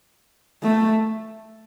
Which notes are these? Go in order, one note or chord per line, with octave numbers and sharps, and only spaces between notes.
A3